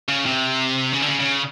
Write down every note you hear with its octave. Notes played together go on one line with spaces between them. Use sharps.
C#3
C3
C#3
D3
C#3
C#3